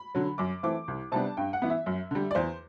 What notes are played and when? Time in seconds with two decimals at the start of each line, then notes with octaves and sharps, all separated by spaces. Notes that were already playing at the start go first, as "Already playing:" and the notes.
Already playing: B5
0.15 D3 F#3
0.38 F#2 D6
0.63 E3 A3 C4 D6
0.88 C2
1.12 C3 G3 B3 D4 A5
1.37 G2 G5
1.53 F#5
1.62 E3 B3
1.70 E5
1.86 F#2
2.11 D3 G3
2.31 D5
2.35 E2 C5